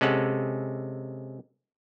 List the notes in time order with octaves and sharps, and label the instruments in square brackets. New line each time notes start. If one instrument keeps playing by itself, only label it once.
[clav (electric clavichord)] C3 G#3 C#4 A4 F#5